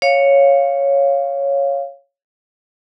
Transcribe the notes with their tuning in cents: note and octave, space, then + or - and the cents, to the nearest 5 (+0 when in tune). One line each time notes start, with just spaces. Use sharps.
C#5 +0 F5 +0